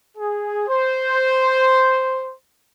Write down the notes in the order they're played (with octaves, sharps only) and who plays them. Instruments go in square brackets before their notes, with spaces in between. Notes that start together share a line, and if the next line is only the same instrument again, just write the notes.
[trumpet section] G#4
C5